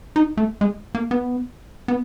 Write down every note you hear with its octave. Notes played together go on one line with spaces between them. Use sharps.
D#4
A3
G#3
A#3
B3
B3